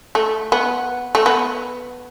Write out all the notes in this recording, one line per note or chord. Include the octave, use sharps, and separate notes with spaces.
A3
B3
A3
B3